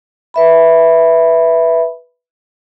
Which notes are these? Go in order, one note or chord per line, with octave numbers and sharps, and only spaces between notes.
B4 E5 B5